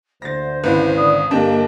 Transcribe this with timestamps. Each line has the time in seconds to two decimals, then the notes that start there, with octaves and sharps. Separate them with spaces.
0.22 D2 C5 A6 A#6
0.64 G#1 C#2 E4 B4
0.96 D3 D5 D#6
1.31 G1 A#3 D4 G4 D#5 A5